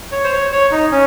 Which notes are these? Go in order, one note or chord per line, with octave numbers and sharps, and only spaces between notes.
C#5
C5
C#5
C#5
D#4
C#4